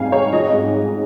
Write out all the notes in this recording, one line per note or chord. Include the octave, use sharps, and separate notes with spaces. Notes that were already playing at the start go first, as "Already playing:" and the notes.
Already playing: G#2 G3 C4 F5 G#5
G#2 C#5
F3 D#5
G#2
G#3